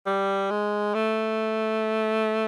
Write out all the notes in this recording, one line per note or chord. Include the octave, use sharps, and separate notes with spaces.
G3
G#3
A3